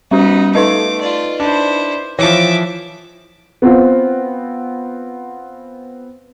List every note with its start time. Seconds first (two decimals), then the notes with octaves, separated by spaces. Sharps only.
0.11 G3 B3 C#4 D#4 F#4
0.55 A3 D#4 B4 D#5 D6
1.01 F4 D5
1.40 D4 E4 C5
2.19 E3 F3 C#5 E5 D6
3.62 B3 C4 F4